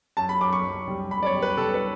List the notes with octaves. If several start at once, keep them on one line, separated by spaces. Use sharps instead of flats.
F#2 A5
B5
F#2 D6
C#6
F#2
G3
F#2 B5
D5
C#5
G3
B4
G3 A4
B4